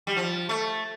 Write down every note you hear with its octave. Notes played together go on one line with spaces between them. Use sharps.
G3
F3
A3